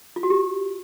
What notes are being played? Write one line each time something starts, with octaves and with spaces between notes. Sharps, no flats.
F4
F#4
G4